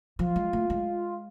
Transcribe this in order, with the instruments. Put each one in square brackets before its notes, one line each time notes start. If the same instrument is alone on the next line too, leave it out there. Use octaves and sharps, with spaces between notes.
[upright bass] F3 [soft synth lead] F4
[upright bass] G#3
A3
G#3